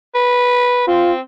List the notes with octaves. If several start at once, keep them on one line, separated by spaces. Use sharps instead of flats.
B4
C4 F4